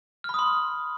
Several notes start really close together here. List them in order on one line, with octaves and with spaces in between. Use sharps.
F6 B5 D#6 C6